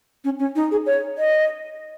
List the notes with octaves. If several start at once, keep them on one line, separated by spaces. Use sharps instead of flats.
C#4
C#4
D#4
G#4
C#5
D#5